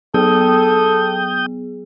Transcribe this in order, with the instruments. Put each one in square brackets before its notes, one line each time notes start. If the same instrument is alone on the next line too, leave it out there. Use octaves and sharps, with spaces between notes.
[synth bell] F#3 B3 G#4 [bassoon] A4 [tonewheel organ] G5 D#6 G6